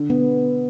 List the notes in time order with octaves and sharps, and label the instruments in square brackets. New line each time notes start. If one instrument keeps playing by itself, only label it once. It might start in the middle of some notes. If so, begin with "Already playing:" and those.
Already playing: [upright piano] D3
[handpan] B3